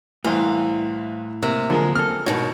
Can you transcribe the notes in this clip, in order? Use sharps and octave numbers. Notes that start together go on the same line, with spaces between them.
C2 A2 E3 C5 F5
C3 A#3
D3 F3 F#3 G#3 A#4
C4 A4 F6
G#2 B2 D#3 D#4 F#4 C#5